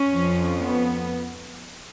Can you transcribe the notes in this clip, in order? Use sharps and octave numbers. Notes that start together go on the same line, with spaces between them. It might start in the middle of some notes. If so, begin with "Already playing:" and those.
Already playing: C#4
F2 F3
B3